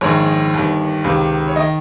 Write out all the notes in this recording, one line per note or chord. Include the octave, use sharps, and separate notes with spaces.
A#1 G#2 D#3 C#5
G1 G2 D#3
C#2 C3 D#3
C#5
D#3 D#5